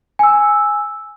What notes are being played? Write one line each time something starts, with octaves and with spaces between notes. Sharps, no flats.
G#5 E6